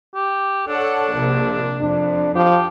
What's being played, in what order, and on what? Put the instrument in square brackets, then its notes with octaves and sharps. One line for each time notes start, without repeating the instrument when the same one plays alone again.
[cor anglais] G4
[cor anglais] D4 [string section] A4 C#5 F#5
[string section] A#1 C3
[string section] F2 [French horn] D4
[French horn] F3 [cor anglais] G4